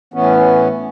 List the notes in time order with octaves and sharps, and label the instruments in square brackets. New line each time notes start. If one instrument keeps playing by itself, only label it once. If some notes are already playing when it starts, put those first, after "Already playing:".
[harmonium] A2 E3 B3 C#4